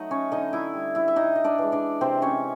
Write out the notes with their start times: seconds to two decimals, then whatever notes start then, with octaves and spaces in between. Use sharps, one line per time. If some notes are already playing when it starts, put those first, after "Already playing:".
Already playing: F#3 A3 D#4 D#5
0.11 C#4 C#5
0.32 D3 D#4 D#5
0.53 E4 E5
0.74 G3
0.95 E4 E5
1.08 E5
1.16 A2 D#4 D#5
1.35 D#5
1.44 D4 D5
1.58 E3 G#3
1.72 D4 D5
2.01 C3 C4 C5
2.22 C#4 C#5